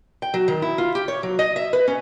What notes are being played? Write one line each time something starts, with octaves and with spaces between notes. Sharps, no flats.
G5
F#3
D#3
E4
F4
G4
C#5
F#3
D#5
E5
B4
C#4